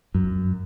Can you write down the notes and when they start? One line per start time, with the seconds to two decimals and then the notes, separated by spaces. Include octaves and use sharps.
0.15 F#2